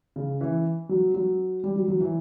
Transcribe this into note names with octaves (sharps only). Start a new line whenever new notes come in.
C#3
E3
F#3
F#3
G3
F#3
F#3
E3